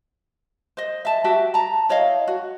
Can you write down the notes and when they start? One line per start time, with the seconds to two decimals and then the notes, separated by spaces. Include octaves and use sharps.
0.77 C5 D#5
1.05 E5 A5
1.24 F#4 G4 E5
1.54 A5 A#5
1.89 E4 C#5 D#5 F5
2.28 F#4